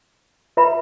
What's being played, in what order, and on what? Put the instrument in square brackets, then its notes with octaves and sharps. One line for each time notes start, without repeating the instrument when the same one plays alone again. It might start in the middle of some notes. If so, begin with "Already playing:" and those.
[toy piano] F4 B4 E5 B5